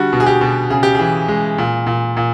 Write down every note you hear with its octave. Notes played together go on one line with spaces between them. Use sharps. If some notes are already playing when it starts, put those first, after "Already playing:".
Already playing: D3 G3 F#4
B2
G#4
G4
B2
C#3 G#4
G4
E3 G#4
G#3
A#2
A#2
A#2